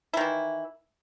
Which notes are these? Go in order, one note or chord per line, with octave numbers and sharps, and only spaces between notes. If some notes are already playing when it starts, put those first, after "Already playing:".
D#3 E3 E4